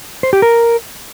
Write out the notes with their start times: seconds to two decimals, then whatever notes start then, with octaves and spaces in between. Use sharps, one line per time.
0.23 C5
0.33 G4
0.42 A#4